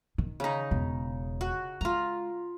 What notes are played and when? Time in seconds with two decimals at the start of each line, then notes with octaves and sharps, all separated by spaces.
0.18 D#3
0.40 C#3 D#4
0.71 E1
1.41 F#4
1.81 G#3 F4 A#5